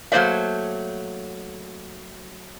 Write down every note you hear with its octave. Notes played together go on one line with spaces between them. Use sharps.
F#3 A3 A#3 C5 D5 E5